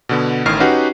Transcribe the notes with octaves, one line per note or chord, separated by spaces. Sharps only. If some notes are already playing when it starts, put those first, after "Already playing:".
B2 D3 B3
A1 A2 D#3 F6 C7
C#4 D#4 F#4 G4 B4 F#5